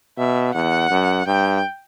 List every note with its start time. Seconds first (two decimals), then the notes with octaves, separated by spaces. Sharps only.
0.18 B2 E5
0.54 E2 F#5
0.91 F#2
1.27 G2 G5